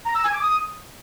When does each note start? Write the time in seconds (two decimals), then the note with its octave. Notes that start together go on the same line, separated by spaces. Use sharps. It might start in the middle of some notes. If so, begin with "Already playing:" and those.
0.06 A#5
0.15 E6
0.24 G#5
0.33 D6
0.42 D#6